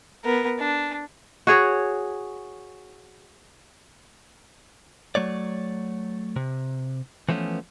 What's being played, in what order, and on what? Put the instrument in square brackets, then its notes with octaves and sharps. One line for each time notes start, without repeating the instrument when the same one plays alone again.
[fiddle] B3 A#4
D4
[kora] F#4 G#4 C#5
[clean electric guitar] F#3 A3 C#5 D5
C3
E3 F3 A3 B3 C#4